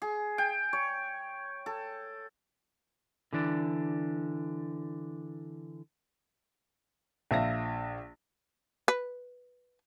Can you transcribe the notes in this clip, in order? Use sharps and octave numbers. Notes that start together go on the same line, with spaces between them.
G#4
G5
C#5
A4
D3 E3 D4
A#1 E5 F5 A#6
B4